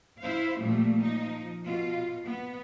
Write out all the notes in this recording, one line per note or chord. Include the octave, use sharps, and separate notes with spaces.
E4 C5 F5
A#2 F3 G3 A3
F3 D#4
B2 F4
B3